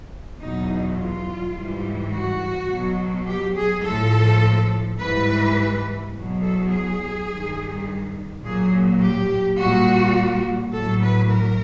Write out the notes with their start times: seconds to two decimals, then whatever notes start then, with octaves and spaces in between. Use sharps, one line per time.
0.39 E2 B2 F#3 D#4
0.96 F4
1.53 G#2 E3 G3
2.12 F#4
2.69 B2 F#3
3.26 G4
3.55 G#4
3.84 A2 F3 A4
4.99 G#2 E3 G3 B4
6.13 E2 B2 F#3
6.42 A4
6.71 G#4
7.29 G2 D#3 G3
8.43 A#2 F#3 G#4
9.01 G4
9.59 A#2 G3 F#4
10.74 A2 F#3 A4
11.02 B4
11.31 A#4